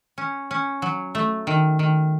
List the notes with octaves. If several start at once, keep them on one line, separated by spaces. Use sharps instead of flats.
C#4
C#4
F#3
A3
D#3
D#3